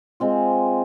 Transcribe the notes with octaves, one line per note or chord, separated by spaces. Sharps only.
G#3 C4 F4